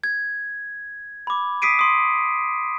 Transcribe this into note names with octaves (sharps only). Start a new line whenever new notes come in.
G#6
B5 D6
D#6 B6 C7 D7 D#7
C6 D#6